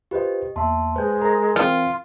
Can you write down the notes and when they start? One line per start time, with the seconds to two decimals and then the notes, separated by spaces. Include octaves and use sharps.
0.11 F4 G4 B4 C5 D#5
0.56 E2 A#3 E5 A5 C6
0.96 G#3 B4 C5 G#5 G6
1.22 A#4 A#5 A#6
1.56 E3 C4 F4